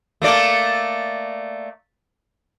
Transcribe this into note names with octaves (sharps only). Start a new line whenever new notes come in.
A3 A#3 D5